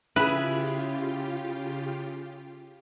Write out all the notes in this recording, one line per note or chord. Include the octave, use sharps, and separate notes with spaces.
C#3 C#4 E4 F4 G4 G#4 B4